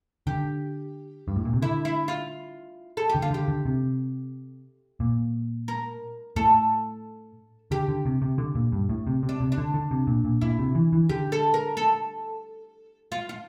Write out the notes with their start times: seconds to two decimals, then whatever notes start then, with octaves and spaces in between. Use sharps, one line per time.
0.27 D3 G4
1.28 G2
1.36 A2
1.45 A#2
1.53 C3
1.62 D3 E4
1.85 E4
2.08 F4
2.97 A4
3.09 G4
3.15 D3
3.22 F4
3.31 D3 G4
3.48 D3
3.65 C3
5.00 A#2
5.68 A#4
6.36 A2 A4
7.71 D3 G4
7.88 D3
8.05 C3
8.22 C3
8.38 D3
8.55 A#2
8.72 G2
8.89 A2
9.07 C3
9.23 C3
9.29 D4
9.40 C3
9.52 D4
9.58 D3
9.74 D3
9.91 C3
10.07 A#2
10.24 A#2
10.41 A#2 E4
10.59 C3
10.75 E3
10.93 E3
11.09 D3 G4
11.32 A4
11.54 A#4
11.77 A4
13.12 F4
13.29 F4